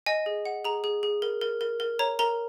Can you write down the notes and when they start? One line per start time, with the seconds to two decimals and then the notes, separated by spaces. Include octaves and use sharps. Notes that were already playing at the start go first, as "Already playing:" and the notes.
0.06 D#5 G#5
0.26 G#4
0.45 F#5
0.65 G#4 A#5
0.84 G#4
1.03 G#4
1.22 A#4
1.41 A#4
1.61 A#4
1.80 A#4
1.99 C#5 A#5
2.19 A#4 A#5